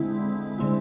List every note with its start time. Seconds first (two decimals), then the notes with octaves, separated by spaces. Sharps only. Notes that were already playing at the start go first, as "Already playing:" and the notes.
Already playing: D3 G#3 C4 E4
0.59 D3 G#3 C4 E4